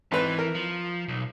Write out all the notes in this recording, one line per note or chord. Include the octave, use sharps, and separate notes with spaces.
G#1 E3 B4
A#4
F3
B1